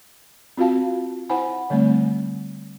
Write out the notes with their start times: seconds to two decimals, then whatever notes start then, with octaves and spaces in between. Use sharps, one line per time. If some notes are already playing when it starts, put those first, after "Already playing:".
0.57 C4 F4 F#4 F5 A5
1.29 E4 C5 F#5 G#5 B5
1.70 D3 G3 A3 C4